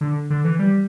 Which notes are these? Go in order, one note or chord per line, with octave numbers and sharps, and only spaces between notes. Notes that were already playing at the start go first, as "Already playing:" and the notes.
D3
D3
E3
G3